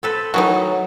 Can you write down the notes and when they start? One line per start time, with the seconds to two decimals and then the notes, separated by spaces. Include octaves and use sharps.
0.03 C4 A4 B4
0.34 D#3 E3 F#3 A3 D#4 F#4